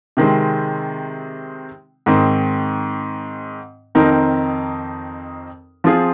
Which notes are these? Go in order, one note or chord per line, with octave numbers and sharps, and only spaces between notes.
C3 D#3 G#3 C4
G#2 D#3 C4
F2 D#3 C4 D#4 A#4
F3 C4 F4 G#4